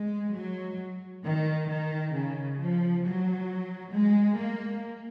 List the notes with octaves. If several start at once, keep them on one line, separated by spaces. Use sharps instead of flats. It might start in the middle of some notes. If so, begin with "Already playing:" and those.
Already playing: G#3
F#3
D#3
D#3
C#3
F3
F#3
G#3
A#3